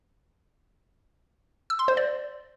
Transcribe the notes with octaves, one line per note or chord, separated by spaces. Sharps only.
E6
C6
C5
D5